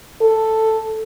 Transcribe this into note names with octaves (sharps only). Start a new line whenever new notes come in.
A4